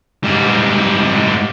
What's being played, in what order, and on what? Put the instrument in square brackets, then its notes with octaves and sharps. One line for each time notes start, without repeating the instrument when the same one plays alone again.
[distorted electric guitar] G#2 G3